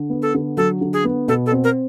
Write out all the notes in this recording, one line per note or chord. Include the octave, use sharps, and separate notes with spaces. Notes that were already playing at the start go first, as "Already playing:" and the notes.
Already playing: D3
B3
A4
D3
F#3 A4
D3
G#4
B3
B2 A4
A4
C4
A#4